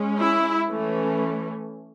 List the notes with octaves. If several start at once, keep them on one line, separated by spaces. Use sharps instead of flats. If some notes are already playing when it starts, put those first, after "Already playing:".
Already playing: G#3 C#4
E4
E3 A3 C#4